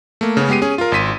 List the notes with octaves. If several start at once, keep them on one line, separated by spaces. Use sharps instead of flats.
A3 A#3
C#3 B3 C#4
G#3 B3 G4 C7 D#7
C#4 G#4
F4 A#4
G#1 C6 B6 D#7